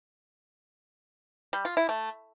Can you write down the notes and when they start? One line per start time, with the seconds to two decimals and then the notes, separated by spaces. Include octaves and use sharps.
1.53 G3
1.65 F4
1.77 E4
1.89 A3